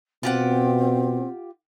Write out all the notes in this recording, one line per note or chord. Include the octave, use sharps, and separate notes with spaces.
B2 C4 F4 G4 F#5